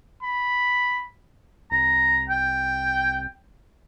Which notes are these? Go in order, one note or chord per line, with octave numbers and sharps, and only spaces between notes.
B5
C2 A#5
G5